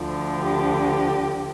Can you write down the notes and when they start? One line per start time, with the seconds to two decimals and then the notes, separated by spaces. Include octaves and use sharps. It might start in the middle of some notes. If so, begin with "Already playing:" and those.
Already playing: D2 D3 F3
0.39 G4